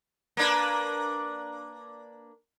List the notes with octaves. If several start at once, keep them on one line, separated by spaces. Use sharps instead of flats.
A#3 D4 B4